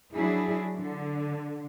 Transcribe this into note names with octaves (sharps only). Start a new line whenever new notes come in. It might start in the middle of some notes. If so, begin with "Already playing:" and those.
F#3 D4 E4 G#4
D3